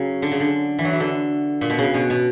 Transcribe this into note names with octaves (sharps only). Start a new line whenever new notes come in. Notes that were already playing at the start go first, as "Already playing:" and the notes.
Already playing: C#3 F#3
D3
C#3
D3
E3
F#3
E3
D3
A#2
B2
C#3
B2
B2